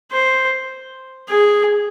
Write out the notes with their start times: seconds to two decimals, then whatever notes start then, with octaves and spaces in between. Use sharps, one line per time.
0.11 C5
1.29 G#4